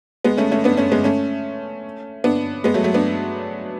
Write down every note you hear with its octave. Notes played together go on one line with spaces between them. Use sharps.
G#3 B3
A3 C#4
A3 C#4
B3 D4
A3 C#4
G#3 B3
A3 C#4
B3 D4
G#3 B3
F#3 A3
F#3 A3
B3 D4